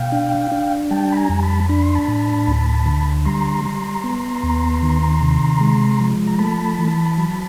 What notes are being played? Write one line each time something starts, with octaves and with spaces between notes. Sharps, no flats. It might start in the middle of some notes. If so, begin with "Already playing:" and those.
Already playing: B2 F5 G5
D4
D4
G3 G5 A5
B5
G#5 A#5
F2
A5 B5
D4 B5
C6
A5 B5
A2
D2
D3
G3 A#5 C6
G3
B3
D#2
D#3
C3
G#3
F3
A#5
A3 A5 B5
E3
F#3